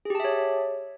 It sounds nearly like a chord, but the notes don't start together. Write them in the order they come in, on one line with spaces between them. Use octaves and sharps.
G#4 G4 A5 E5 C#5